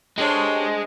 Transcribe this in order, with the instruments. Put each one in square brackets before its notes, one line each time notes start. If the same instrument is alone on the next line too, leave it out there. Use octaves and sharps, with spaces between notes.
[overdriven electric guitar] G#3 [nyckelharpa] D4 C5 [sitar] G4 A4 C#5